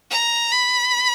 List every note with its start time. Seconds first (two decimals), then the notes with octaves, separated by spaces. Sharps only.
0.11 A#5
0.52 B5